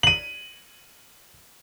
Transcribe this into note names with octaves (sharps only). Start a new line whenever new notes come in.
D#7 F#7